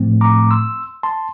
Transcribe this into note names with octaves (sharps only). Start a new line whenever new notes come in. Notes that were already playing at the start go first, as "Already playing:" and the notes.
Already playing: A2 F3 A3 C4
A#5 D6
C6 E6
A5 C6